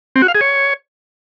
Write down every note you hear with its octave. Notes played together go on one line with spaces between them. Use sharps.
C4
F#4
F5
G#4
C#5